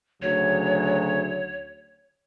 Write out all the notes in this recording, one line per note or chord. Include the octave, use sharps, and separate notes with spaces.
D2 C#3 F#3 C#5